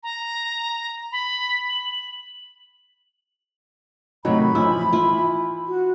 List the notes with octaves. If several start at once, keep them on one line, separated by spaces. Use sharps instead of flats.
A#5
B5
F#7
A2 C3 D#3 F#3 D#4 B5
E3 F3 E4 E6
E4 F4
F#4